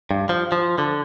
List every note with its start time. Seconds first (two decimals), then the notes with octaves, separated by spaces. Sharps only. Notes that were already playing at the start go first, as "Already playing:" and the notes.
0.11 G2
0.29 F3
0.52 F3
0.78 D3